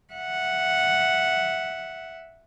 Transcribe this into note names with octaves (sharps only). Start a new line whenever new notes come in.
E5 F#5